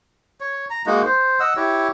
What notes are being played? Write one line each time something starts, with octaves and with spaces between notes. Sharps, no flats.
C#5
A#5
G#3 A#3 D#4 F#4
C5
D#5 F#5 E6
E4 G4 C#5